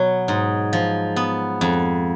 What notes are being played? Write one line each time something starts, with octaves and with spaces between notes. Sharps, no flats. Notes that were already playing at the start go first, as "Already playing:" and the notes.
Already playing: B2 F#3 B3
G#2
F3
B3
F2